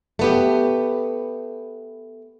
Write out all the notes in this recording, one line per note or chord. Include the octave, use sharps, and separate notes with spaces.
A3 B3 G4